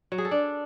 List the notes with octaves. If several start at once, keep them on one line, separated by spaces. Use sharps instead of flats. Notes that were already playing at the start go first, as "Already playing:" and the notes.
F#3
G#4
A4
D4